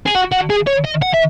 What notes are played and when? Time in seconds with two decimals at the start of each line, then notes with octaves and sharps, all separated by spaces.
0.06 G#4
0.15 F#4
0.32 F#4
0.50 G#4
0.67 C#5
0.85 D#5
1.03 F#5
1.14 E5